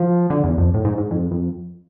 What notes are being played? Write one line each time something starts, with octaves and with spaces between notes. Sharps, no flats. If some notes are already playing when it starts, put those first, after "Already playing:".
Already playing: F3
D3
E2
F2
A2
G#2
G#2
F2
F2